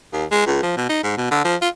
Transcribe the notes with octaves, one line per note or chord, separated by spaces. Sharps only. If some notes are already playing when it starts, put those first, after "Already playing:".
D#2
G#3
C#2
F3
B2
D#4
G#2
B2
D3
F3
F4